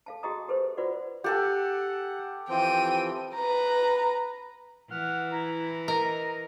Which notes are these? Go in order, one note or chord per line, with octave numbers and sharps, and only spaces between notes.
A4 F5 A5
F#4 G#4 D#5 G5 A#5 D#6
G4 A4 B4 C5
F4 F#4 B4 C5 D5 F#5
G4 A4 F#5 G#5
E3 F3 C4 G5 D#7
B4 A#5
E3 F#5 F6
E4 A#5
A#4 D#5 A#5